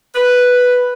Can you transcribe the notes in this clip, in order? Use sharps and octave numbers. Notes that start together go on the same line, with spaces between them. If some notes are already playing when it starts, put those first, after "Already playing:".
B4